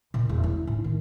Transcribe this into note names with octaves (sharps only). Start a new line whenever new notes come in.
A#2
E1
E4
A2
D#3